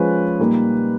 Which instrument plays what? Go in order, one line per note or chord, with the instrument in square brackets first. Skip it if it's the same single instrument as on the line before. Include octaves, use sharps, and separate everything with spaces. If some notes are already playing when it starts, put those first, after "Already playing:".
Already playing: [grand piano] F3 G#3 C#4 F4 B4
A#2 G3 A#3 D#4